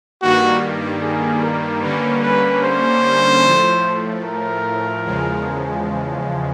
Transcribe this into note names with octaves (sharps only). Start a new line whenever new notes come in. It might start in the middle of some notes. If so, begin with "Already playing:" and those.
G2 D#3 G3 A#3 F#4
G#4
A#4
D3 G3 A#3 C#4 B4
B4
C5
A2 F3 A3
A#4
E2 C#3 F3 G#3